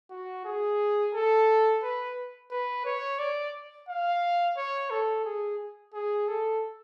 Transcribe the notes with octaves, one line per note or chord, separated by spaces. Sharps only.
F#4
G#4
A4
B4
B4
C#5
D5
F5
C#5
A4
G#4
G#4
A4